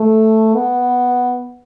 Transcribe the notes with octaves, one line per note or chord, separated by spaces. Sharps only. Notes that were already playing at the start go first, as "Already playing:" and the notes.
Already playing: A3
B3